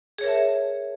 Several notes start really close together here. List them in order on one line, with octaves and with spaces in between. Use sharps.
G#4 C#5 A#4 E5 A5